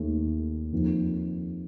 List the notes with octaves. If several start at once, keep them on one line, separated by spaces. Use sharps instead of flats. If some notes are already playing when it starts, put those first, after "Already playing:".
Already playing: D#2 D#3 A3
F2 D#3 A#3